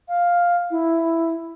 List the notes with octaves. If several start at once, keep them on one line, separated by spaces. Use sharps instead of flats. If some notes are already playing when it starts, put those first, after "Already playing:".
F5
E4